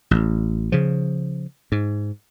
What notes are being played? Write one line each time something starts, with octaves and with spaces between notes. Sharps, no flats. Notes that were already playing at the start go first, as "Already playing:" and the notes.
A1
C#3 F3
G#2